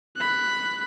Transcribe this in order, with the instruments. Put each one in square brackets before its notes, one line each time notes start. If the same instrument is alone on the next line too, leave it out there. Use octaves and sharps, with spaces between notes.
[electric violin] B5 F#6